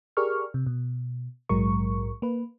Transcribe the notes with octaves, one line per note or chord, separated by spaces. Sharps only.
G4 G#4 A#4 D5 C#6 F6
C3
B2
A#1 G#2 F#3 G#3 A#4 C#6
A#3 B4